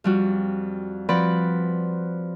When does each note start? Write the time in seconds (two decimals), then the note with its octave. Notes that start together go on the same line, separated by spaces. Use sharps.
0.04 F2 G3 F#4
1.09 F3 C4 B4 D5 F#5 B5